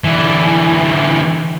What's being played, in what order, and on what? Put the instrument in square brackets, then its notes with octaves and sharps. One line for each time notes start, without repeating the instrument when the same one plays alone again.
[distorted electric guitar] D3 E3